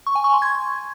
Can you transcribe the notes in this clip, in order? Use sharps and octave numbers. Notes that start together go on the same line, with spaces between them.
C#6
G#5
C#6
C6
G#6